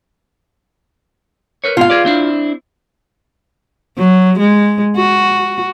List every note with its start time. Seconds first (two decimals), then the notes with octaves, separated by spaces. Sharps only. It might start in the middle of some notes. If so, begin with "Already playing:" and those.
1.64 A#4 B4 C#5
1.77 G#2 B2 F4 F5
1.90 G#4 B4 D5
2.05 C4 D4 E4
3.98 F#3
4.39 G#3
4.96 F#4